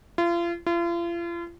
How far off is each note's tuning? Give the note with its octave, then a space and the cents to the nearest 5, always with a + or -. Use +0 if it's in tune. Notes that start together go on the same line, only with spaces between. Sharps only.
F4 -35
F4 -40